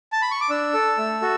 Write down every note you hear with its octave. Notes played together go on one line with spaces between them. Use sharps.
A5
B5
C#6
D6
D4 E6
A4
A3
F#4 A4